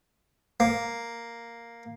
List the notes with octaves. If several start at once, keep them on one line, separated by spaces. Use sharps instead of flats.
A#3